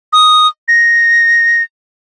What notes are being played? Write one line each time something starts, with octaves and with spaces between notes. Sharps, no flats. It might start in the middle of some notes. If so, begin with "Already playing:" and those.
D#6
A#6